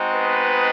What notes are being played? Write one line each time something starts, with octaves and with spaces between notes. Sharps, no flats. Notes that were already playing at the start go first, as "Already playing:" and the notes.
Already playing: G#3 C4 D#4 F#4
B3 B4